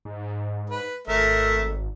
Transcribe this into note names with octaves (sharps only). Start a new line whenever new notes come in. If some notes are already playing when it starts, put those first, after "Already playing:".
G#2
B4
G#1 A3 A#4 E5